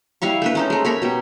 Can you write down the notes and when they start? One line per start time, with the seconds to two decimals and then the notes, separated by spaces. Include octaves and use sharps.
0.22 G3 E4 F5 C#6
0.42 A3 D4 B4
0.55 C#4 D#4 C5
0.70 G#3 A3
0.85 A#4 C#5 B5
1.02 B2 G4